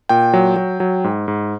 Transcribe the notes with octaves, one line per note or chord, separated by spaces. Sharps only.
A#2 G5
F#3
F#3
F#3
G#2
G#2